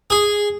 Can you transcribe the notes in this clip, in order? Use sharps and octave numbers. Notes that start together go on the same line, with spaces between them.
G#4